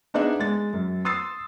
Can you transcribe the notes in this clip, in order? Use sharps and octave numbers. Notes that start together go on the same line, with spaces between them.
B3 D4 D#4 G#4 D5 E5
G#3 A6
F#2
C6 D#6 E6 A6 C7